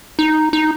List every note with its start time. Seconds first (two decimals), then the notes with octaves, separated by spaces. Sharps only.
0.19 D#4
0.53 D#4